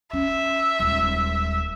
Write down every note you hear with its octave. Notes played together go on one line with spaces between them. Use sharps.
C#4 E5
D#1 G#3